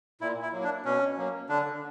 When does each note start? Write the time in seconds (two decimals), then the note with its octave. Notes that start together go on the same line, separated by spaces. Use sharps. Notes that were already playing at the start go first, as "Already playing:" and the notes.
0.21 A#2 E4
0.42 E4
0.53 F#3 A#3
0.64 D4
0.85 B2 C#4
1.18 F#3 A#3
1.49 D3 D4